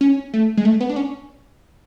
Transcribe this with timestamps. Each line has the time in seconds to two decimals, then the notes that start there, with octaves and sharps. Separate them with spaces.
0.01 C#4
0.34 A3
0.57 G#3
0.65 A3
0.81 B3
0.89 D4
0.96 C#4